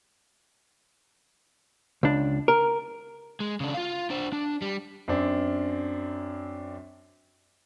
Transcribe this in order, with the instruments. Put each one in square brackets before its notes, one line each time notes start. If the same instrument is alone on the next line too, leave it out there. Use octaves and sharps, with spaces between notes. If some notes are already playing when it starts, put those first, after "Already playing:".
[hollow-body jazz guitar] C#2 D4
A#4
[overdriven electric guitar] G#3
C#3 D4
F4 F5
D4 C5
D4
G3
[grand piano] F#2 C4 D4